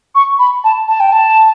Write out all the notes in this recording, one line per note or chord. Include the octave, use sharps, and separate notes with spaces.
C#6
B5
A5
A5
G5
A5